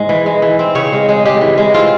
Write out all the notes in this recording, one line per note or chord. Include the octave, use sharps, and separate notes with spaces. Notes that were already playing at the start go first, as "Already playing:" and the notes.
Already playing: G#2 G#3
E3
G#3
E3
C4
C#3 C#5
G#3
G#3
G#3 G4
E3
G#3
C4 F4